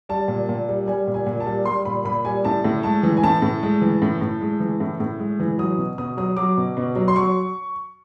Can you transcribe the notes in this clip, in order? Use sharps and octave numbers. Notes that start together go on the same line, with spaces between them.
G3 A5
A#2
A#2
G3
G3 G#5
A#2
G#5
A#2
A5
G3
G3 C6
A#2 B5
A#2 B5
G3 G#5
A2 A5
A2
G#3 A5
E3
G#5
A2 A5
A2
G#3
E3
A2
A2
G#3
E3
A2
A2
G#3
E3
F#3 D#6
B2
B2 D#6
F#3 D#6
F#3 D6
B2
B2
F#3
C6
F#3 C#6